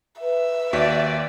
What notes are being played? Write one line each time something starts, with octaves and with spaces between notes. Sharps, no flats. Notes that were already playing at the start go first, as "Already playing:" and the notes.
B4 E5
D#2 F#4 D5 B6